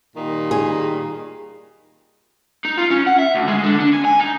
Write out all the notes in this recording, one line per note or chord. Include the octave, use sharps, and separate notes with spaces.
A#2 D#3 G3
G#4
D#4
F4
C#4
F#5
E5
D2
G#3
D3
D4
G#5
G#5
D#4